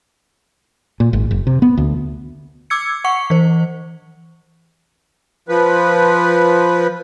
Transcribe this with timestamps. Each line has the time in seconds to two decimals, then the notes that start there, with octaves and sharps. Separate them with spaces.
1.00 A#2
1.13 G#1
1.31 F#1
1.47 C3
1.62 B3
1.78 D2
2.70 D6 E6 G#6 C#7
3.04 F#5 C#6 C#7
3.30 E3 C5
5.49 F3 B4